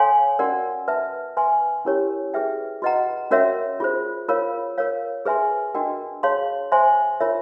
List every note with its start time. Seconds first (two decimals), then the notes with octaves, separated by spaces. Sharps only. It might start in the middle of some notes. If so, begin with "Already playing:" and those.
Already playing: A4 C#5 F5 G#5 C6
0.39 C#4 F#4 A#4 D5 F#5
0.88 B4 E5 A5
1.37 B4 E5 G#5 C6
1.85 C#4 E4 G4 A#4 C#5
2.34 G#4 B4 E5 G5
2.82 F#4 B4 D#5 F#5 A#5
3.31 C#4 F#4 A#4 C#5 E5
3.80 F4 G#4 C5
4.28 F4 A#4 C#5 F5
4.78 A#4 C#5 F5
5.25 G#4 B4 E5 G#5 C6
5.75 D4 F#4 A#4 D#5 G5
6.23 G#4 C#5 F5 A5 C6
6.72 C5 E5 G#5 C6
7.20 F4 A#4 C#5 E5